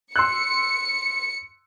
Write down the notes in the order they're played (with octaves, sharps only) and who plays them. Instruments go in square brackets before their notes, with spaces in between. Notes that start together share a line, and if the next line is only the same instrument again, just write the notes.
[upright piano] C6 E6 F#6 [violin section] C#7